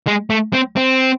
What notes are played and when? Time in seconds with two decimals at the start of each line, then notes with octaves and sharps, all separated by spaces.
0.07 G#3
0.30 A3
0.53 C4
0.76 C4